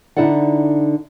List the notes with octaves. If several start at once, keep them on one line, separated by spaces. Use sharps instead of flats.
D3 D#4 E4 A4 D5 F#5